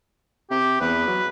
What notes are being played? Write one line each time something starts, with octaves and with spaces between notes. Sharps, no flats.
C3 G4
E2 B4
F#3